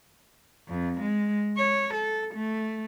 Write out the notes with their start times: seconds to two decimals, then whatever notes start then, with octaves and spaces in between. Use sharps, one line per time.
0.68 F2
1.01 G#3
1.57 C#5
1.94 A4
2.35 A3